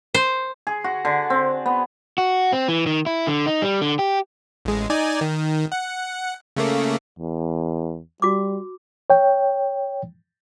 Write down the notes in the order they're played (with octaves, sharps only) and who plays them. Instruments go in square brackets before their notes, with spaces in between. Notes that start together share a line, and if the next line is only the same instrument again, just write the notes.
[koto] C5
[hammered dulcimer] G#4
F#4
D3
C4
B3
[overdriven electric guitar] F#4
C4
E3
D#3
E4
D3
D#4
G3
D3
G4
[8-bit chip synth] A1 G#3
D#4 D5 G#5
D#3
F#5
C#3 A3 A#3
[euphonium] E2
[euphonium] G3 [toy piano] F#4 D6
[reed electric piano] C#5 G5